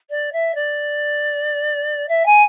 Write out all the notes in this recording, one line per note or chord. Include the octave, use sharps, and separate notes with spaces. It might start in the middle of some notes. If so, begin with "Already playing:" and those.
D5
E5
D5
E5
G#5